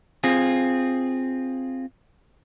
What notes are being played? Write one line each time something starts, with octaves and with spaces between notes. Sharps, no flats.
C4 F4 G#4